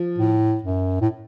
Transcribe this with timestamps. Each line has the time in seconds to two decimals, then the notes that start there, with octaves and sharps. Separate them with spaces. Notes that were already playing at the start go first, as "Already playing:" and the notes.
Already playing: F3
0.18 A2
0.63 F#2
1.01 A2